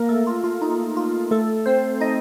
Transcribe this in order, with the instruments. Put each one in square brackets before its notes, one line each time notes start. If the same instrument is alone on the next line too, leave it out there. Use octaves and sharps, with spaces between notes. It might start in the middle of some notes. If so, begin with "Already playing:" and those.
Already playing: [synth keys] A#3 A#4
A3 A4
F4
F4
D#4
F4
A3 A4
C4 C5
D#4 D#5